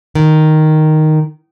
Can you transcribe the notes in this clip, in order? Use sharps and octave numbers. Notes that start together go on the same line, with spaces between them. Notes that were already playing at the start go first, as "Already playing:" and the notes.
D#3